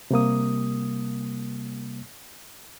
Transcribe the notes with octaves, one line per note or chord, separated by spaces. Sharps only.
C3 G3 A#3 D#6